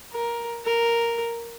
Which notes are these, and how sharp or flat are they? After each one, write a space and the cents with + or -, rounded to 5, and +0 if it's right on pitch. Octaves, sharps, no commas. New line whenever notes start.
A#4 +10
A#4 +0